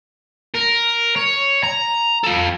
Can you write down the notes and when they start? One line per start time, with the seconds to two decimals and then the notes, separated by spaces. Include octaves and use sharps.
0.55 A#4
1.16 C#5
1.63 A#5
2.24 F3 A4